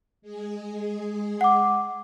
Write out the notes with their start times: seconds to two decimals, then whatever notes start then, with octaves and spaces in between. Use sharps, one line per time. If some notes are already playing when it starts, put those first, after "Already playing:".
0.22 G#3 G#4
1.41 F#5 D6